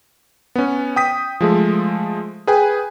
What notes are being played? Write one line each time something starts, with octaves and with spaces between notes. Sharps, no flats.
B3 C#4
G5 D#6 B6
F3 G#3 A3
G#4 B4 G5 G#5